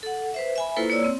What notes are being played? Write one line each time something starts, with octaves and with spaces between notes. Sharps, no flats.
A4 F#5
B4 C5 E5
E5 G#5 B5
A#3 E4 F4 A4 B4 C5
A#3 C#5 D5 E6
C4